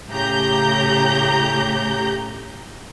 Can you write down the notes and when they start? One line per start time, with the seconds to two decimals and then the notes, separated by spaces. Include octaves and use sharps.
0.10 A2 C#3 G4 A#5 G6